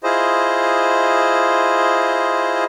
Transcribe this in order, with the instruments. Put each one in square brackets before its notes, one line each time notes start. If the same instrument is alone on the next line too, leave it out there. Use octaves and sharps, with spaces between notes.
[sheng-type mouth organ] E4 F4 G#4 C5 D#5